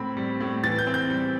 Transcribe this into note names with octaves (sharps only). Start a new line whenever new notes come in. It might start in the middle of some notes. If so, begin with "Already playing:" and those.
Already playing: A2 C4 B5
G3
A2
E3 A6
G6
C4
G6
G3